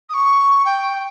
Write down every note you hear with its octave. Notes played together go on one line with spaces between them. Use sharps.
D#6
C#6
G5
G5